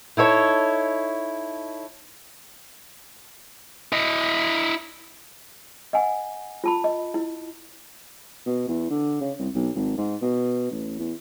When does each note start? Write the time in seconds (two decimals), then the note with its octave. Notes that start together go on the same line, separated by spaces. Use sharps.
0.17 D#4 E4 A4 C#5
3.92 E4 D#5
5.93 D#5 F#5 G#5
6.64 F4 A5 B5
6.84 D#5
7.14 E4
8.46 B2
8.68 E2
8.90 D3
9.21 C#3
9.39 C2
9.55 B1
9.75 G#1
9.97 G#2
10.22 B2
10.71 A1
10.98 E2